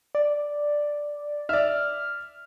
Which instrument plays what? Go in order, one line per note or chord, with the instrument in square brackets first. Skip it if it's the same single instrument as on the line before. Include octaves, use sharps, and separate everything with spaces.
[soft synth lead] D5
[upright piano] D5 E5 [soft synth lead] F6